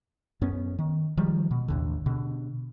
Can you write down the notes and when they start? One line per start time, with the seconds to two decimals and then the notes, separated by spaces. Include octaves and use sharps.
0.41 F#2 B3 C#4
0.79 D#3
1.17 D#3 F3 G3 G#3
1.51 B2
1.68 A1 D#2 D3
2.06 B2 D3